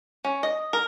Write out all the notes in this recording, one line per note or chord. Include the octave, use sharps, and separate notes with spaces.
C#4
D#5
A#4